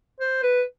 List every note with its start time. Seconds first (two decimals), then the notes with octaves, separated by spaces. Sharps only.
0.20 C5
0.43 B4